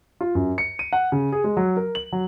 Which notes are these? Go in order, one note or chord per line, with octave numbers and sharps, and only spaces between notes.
F4
F#2
C#7
D#7
F#5
C#3
G#4
G#3
F#3
A#4
F#7
F#3